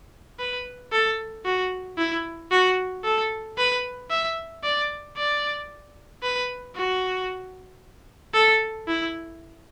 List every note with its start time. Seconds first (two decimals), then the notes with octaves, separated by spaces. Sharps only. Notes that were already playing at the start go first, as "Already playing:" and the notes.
0.39 B4
0.92 A4
1.45 F#4
1.98 E4
2.51 F#4
3.04 A4
3.58 B4
4.10 E5
4.64 D5
5.17 D5
6.23 B4
6.76 F#4
8.34 A4
8.88 E4